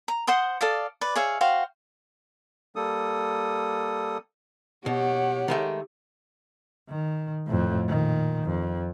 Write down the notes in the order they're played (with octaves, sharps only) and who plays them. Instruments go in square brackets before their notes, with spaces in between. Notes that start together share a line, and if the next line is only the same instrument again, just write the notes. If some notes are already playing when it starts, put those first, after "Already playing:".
[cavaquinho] A#5
C5 F#5 C6 D#6
A4 D5 F5 D#6
B4 D5
G#4 C#5 E5 F5
F#4 C5 F5 G5
[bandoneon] G3 A#3 A4 D#6
[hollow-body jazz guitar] B2 [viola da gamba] G4 [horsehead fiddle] C#5 F#5
[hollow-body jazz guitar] D#3 G#3 A3
[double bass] D#3
F2 A2
A#2 D#3
F2